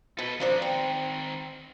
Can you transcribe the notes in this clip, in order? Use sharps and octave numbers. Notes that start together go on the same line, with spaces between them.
B2 A4 B4
D#3 F3 C4 D4 C5
G5